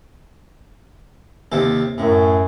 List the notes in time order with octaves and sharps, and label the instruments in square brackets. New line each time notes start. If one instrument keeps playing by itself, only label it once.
[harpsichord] D#2 C3 A4
[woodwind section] F#2 [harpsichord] A2